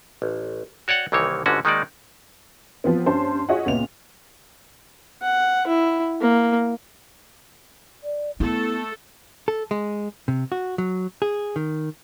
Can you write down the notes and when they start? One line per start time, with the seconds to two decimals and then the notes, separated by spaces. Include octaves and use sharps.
0.22 A1
0.88 F#4 C#5 D5 F#5 G5
1.12 C2 D#3 E3 A#3 C#5
1.46 G1 G#2 D3 C#4 F#4
1.65 D#3 G#3 A#3 D#4 F#4 D5
2.84 F3 B3 C4
3.06 G2 C#4 C5 A5 C6
3.49 F4 G#4 C#5 D#5 E5 F#5
3.66 C#2 A#2 B3 F7
5.22 F#5
5.67 E4
6.21 A#3
8.03 D5
8.40 A3 B3 E4 A4
9.48 A4
9.71 G#3
10.28 C3
10.52 F#4
10.78 F#3
11.22 G#4
11.56 D#3